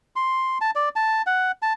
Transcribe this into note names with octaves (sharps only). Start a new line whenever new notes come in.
C6
A5
D5
A5
F#5
A5